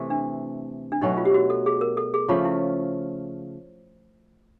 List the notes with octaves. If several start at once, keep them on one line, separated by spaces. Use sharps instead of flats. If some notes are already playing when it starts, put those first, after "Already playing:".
Already playing: C3 E3 A3
D4
D4
B2 F#3 A3 D#4
F4
G4
F#4
A4
G#4
A#4
A4
G#4
C#3 F3 A3 F4
E4